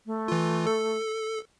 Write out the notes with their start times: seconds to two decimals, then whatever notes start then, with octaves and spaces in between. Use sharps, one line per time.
0.06 A3
0.28 E3 F4
0.67 A4